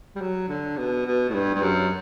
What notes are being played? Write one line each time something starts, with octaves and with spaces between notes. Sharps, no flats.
G3
F#3
D3
B2
B2
A2
G2
G2
F#2